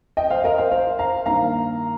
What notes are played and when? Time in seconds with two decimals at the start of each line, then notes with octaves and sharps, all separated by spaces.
0.17 D#5 G5
0.30 C5 F5
0.44 A#4 D#5
0.58 C5 F5
0.71 C5 F5
0.99 F5 A#5
1.25 G2 D#3 A#3 F5 A#5